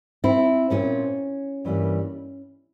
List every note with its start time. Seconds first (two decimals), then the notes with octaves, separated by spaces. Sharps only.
0.24 C4 E4
0.70 A#2 G#3 C4 C#4
1.65 G2 E3 G3 A#3